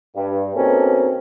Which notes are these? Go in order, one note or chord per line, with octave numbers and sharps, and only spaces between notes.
G2
B2 A#3 C4 C#4 D#4 A4